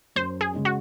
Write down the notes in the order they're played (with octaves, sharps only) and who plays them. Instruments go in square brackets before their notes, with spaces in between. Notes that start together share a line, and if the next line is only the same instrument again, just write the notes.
[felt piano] F#2 [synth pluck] C5
[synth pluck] G#4
[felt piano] C#3 G#3 C#4
[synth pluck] F#4